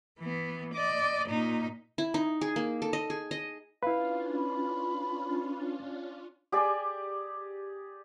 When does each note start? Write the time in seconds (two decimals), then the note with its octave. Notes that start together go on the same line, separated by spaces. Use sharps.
0.19 E3 B3
0.74 D5 D#5
1.29 A#2 D#4
1.98 E4
2.14 D#4
2.41 G#4
2.56 A#3
2.82 A4
2.93 D#5
3.10 G#4
3.31 D#5
3.83 C#4 D4 E4 F4 B4 F5
4.36 B5
6.52 G4 G#4 D5